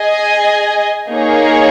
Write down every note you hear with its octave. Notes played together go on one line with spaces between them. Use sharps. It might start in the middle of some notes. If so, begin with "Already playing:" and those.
Already playing: G#4 D#5 G#5
A#3 D#4 G#4 C#5